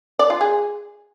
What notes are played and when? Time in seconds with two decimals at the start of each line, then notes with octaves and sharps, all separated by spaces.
0.19 D5
0.30 F4
0.41 G#4